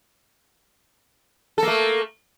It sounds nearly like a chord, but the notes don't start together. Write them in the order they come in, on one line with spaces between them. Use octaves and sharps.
A4 A#3 A3